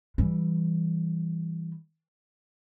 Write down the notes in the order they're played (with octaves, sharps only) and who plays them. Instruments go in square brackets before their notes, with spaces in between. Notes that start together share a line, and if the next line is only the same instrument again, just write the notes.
[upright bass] E3 G3